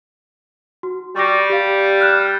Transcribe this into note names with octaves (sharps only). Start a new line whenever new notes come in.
F#4
G3 C#6 D6 A#6
G4 F5
F6 F#6 E7